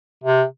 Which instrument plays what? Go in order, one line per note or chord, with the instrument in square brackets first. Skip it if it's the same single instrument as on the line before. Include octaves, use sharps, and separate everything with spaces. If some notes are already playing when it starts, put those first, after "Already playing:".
[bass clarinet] C3